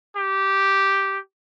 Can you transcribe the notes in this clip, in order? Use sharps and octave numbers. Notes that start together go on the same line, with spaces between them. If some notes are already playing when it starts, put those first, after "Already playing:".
G4